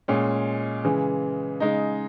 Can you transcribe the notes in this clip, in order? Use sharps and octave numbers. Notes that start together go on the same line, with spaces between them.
A#2 G#3 C#4
C#3 E3 G#3
C#3 G#3 D#4